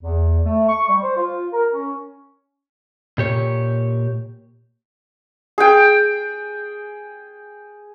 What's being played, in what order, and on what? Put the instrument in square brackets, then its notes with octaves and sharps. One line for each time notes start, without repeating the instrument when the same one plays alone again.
[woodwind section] E2
A3
C#6
G3
C5
F4
A#4
C#4
[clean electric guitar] A#2 G4 C#5
[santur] G#4 G5